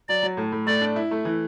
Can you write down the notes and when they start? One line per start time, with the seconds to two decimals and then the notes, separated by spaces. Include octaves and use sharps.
0.09 F#3 D5
0.23 F#3
0.37 A2
0.52 A2
0.67 A3 D5
0.82 D4
0.96 E4
1.11 A3
1.25 E3